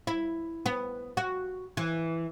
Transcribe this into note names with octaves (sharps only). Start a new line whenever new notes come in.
E4
B3
F#4
E3